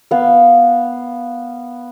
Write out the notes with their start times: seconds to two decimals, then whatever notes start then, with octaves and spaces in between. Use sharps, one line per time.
0.11 B3 F5